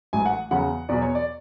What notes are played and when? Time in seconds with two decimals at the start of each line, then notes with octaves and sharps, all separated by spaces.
0.13 A1 G#2 F#3 G#5
0.26 F#5
0.51 E2 C#3 F#3 F#5
0.89 E2 B2 F#3 D5
1.02 C#5
1.15 D5